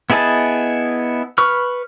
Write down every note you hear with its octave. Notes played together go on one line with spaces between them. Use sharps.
B3 E4 G#4 D#5 A5
B4 C#6 F6